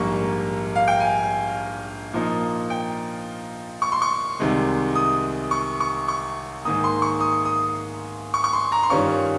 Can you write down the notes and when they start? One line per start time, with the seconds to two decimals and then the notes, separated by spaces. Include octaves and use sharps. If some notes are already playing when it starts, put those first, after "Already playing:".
Already playing: A#1 G#2 G3 A#3 C#6
0.76 F5
0.88 G5
1.00 G#5
2.13 A#2 F3 A#3 D#4
2.70 G5
3.82 C#6
3.92 C6
4.02 C#6
4.39 C2 C3 D#3 G#3
4.95 D#6
5.51 C#6
5.80 C#6
6.08 C#6
6.65 G#2 D#3 A#3 D#6
6.84 C6
7.02 C#6
7.20 D#6
7.45 D#6
8.34 C#6
8.44 C#6
8.53 C6
8.72 A#5
8.83 C6
8.90 G2 D#3 G3 C#4 F4 C#6